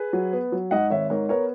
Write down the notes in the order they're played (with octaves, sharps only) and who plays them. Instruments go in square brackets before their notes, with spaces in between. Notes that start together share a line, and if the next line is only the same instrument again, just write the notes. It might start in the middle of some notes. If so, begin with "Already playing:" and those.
Already playing: [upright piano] G#4 B4
F#3
B3
F#3
G#2 D#5 F#5
G#1 C#5 E5
G#2 A#4 C#5
B3 A#4 C#5